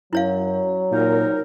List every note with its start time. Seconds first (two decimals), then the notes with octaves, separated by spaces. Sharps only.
0.13 F#2 F#3 E4 C#5 F5
0.91 C2 A#2 D#4 A#4